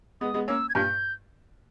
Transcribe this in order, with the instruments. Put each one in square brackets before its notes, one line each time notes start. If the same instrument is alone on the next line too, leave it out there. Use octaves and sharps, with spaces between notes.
[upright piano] G#3 B3 [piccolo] D#6
[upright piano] G#3 B3
[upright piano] A#3 C#4 [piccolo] E6
[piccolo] G#6
[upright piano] G2 A#2 [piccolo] G6